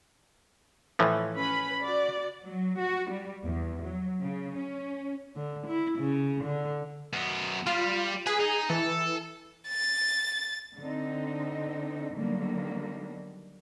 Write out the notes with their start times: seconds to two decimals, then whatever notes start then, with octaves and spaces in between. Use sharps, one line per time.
0.99 A2 E3 F3
1.35 C#4 B4 B5
1.80 F#4 D5
2.43 F#3
2.80 F#4
3.10 G3
3.43 E2
3.83 F#3
4.20 C#3
4.56 C#4
5.36 D3
5.67 E4
5.99 C#3
6.44 D3
7.13 F#2 B3
7.67 G3 F4
8.27 G#4 B4
8.39 D#4
8.70 E3 A4
9.68 A6
10.79 D3 C4 D#4
12.14 D3 D#3 F#3 G3 A#3 B3